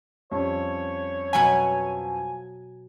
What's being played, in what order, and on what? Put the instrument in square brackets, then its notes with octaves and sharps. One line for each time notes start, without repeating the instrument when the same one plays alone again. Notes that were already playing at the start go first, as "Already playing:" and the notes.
[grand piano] F2 G3 C#4 [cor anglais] C#5
[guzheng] B2 F#3 B5 [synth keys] G#5